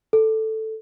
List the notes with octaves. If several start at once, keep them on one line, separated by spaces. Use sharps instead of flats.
A4